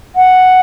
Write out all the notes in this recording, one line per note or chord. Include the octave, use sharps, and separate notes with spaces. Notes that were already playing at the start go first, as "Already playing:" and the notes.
F#5